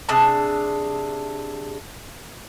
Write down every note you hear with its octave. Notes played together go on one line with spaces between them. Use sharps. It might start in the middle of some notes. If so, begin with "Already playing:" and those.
C3 D4 G#4 A5